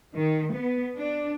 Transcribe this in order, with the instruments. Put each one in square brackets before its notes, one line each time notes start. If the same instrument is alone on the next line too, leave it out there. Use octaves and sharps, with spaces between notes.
[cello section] D#3
B3
D4